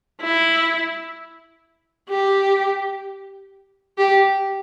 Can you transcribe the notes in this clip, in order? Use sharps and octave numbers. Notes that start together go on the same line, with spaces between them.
E4
G4
G4